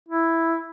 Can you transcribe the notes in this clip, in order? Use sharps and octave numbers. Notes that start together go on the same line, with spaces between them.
E4